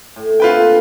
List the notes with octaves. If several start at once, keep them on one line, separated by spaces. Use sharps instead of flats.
A2
A#2 D3 C4 F4 B4 G5